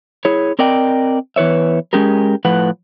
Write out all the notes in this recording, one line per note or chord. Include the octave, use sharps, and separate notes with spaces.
E4 G#4 C#5
C4 A#4 D5 D#5 G5
E2 E3 B4 C#5 E5
G#3 C#4 G4 G#4 A#4
A2 F3 B4 F#5